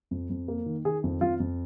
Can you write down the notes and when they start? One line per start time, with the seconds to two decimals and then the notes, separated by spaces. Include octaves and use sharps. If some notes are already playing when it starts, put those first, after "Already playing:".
0.11 F2
0.30 F2
0.48 A#3
0.66 D#3
0.85 D#3 G#4
1.04 F2
1.21 F2 F4
1.40 F2